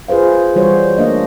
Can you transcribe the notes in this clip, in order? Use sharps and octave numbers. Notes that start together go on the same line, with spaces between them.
F4 G#4 B4 C5 F5
E3 G3 F#4 C5 C#5
G3 A3 A#3 D4 D#5